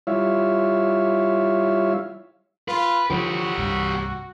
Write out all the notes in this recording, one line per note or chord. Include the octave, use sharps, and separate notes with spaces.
G3 E4 F4 C#5 E5 F5
F4 B4
D3 F3 F#4 G4 C#5
C2 G2